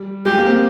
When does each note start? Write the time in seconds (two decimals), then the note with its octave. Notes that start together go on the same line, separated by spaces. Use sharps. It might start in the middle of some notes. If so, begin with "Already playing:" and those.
Already playing: G3
0.25 G#3 G4
0.38 A#3
0.46 C4
0.51 A#3